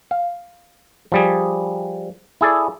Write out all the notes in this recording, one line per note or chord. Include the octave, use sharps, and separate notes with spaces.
F5
F3 G3 G#4
E4 G#4 A4 D5